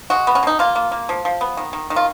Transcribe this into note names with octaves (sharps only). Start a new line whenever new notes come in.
G#3 F#4
B3
C#4
B2 D#4
A#3 F4
A#3
A#3
F3
F3
B3
D#3
D#3
D#3
F4